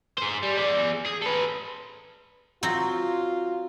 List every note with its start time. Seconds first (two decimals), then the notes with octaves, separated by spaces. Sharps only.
0.18 G#4 C5
0.43 G3
0.58 G#4 D5
1.06 G#4
1.22 A4 B4
2.63 F#3 C4 F4